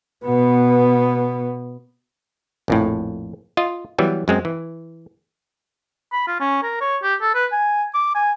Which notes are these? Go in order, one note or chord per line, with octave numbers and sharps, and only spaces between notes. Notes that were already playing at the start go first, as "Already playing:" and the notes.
B2 B3
A#1 F2 A2
F4 D#5
E3 F#3 G3 B3
F#2 G#3 C4
E3
B5
F4
C#4
A#4
C#5
G4
A4
B4
G#5
D6
G#5